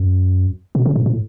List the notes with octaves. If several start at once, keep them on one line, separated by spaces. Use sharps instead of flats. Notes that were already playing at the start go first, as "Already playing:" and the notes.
Already playing: F#2
B2
C#3
A2
A2